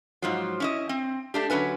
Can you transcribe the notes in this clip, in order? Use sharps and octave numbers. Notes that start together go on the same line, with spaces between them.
G#2 F3 F#3
C#4 E4 D#5
C4
A3 D4 G4
D3 F#3 C#4 B4 G#5